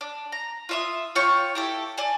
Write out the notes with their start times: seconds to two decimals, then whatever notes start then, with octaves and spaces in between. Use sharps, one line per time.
0.01 D4
0.32 A#5
0.69 F4 E5 D#6
1.15 F4 C#5 G5 C#6
1.55 E4 G4 A4
1.98 D5 G#5 A5